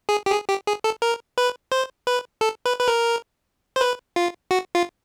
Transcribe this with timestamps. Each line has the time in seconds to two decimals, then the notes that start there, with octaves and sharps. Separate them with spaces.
0.09 G#4
0.26 G4
0.32 G#4
0.49 G4
0.67 G#4
0.84 A4
1.02 A#4
1.38 B4
1.72 C5
2.07 B4
2.41 A4
2.66 B4
2.80 B4
2.88 A#4
3.76 C5
3.81 B4
4.16 F4
4.51 F#4
4.75 F4